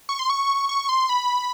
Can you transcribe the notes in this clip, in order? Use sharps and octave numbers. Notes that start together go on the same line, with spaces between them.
C#6
C6
C#6
C#6
C6
B5